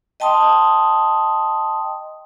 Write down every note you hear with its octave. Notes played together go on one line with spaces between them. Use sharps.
D#5 G5 A5 C6 D#6